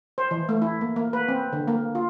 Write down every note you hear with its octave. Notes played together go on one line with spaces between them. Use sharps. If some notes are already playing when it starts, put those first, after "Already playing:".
C5
E3
A3
E4
A#3
A#3
B4
C4
D3
A#3
F4